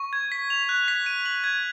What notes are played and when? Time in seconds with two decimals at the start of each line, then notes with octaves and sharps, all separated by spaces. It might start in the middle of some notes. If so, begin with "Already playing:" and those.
Already playing: C#6
0.13 G#6
0.32 B6
0.50 F7
0.69 F#6
0.88 B6
1.06 D#7
1.26 F#7
1.44 G#6